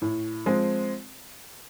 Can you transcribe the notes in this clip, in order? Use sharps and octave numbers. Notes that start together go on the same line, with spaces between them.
A2
F3 G#3 C4